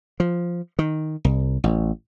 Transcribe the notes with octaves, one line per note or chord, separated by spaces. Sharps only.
F3
D#3
C2
A1